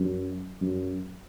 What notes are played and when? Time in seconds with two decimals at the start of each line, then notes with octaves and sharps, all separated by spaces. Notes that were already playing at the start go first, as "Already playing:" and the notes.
Already playing: F#2
0.61 F#2